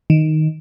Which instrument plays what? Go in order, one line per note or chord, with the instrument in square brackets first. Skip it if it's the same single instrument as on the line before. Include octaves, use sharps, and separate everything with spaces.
[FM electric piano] D#3